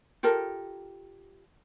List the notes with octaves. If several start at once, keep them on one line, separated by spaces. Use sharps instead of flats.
F4 G4 A4 A#4